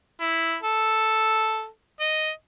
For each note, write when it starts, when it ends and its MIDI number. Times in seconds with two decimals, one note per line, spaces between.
0.21 0.55 64
0.63 1.67 69
2.01 2.30 75